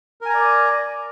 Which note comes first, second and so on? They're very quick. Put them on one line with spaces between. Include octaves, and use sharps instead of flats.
A#4 G#5 A#5 D5